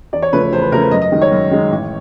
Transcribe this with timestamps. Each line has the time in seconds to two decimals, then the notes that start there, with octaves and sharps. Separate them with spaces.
0.13 E2 D5
0.22 C#5
0.32 C#3 F3 A3 B4
0.43 B4
0.52 E2 C5
0.62 B4
0.72 C#3 F3 A3 A#4
0.82 B4
0.91 F#2 D#5
1.02 D#5
1.12 D#3 G#3
1.22 C#5
1.32 F#2
1.51 D#3 G#3
1.71 A1